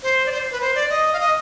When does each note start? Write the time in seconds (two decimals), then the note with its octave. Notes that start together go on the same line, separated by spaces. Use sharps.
0.03 C5
0.26 D5
0.32 C5
0.51 B4
0.61 C5
0.75 D5
0.90 D#5
1.13 F5
1.20 D#5